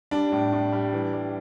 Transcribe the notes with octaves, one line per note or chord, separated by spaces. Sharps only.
G3 D4
A2
A2
G3
E3
G3